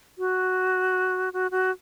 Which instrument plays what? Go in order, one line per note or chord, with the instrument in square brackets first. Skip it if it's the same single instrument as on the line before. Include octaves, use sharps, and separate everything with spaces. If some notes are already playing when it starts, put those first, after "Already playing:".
[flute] F#4
F#4
F#4